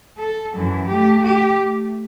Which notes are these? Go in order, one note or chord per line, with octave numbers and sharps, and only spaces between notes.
A4
F#2 E3
A3 G4
G4
A3